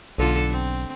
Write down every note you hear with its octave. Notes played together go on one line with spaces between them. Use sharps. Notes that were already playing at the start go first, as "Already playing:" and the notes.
B1 D3 F4 A4
C4